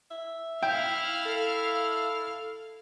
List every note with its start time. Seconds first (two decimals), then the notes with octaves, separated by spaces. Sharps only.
0.11 E5
0.63 E4 F5 G5 F6
1.26 A4